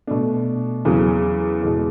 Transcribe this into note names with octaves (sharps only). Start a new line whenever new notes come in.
B2 A3 D4
E2 C#3 F#3
E2 B2 G#3